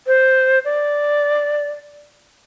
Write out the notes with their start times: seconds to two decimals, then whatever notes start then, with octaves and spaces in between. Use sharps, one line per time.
0.07 C5
0.65 D5